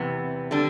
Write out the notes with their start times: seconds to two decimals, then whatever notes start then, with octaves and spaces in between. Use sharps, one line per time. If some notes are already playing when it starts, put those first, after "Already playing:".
Already playing: E2 C3 E3 B3
0.51 D3 G3 D4